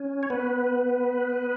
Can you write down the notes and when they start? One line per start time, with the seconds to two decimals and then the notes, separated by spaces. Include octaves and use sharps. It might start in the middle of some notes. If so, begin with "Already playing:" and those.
Already playing: C#4
0.23 C#5
0.30 B3 B4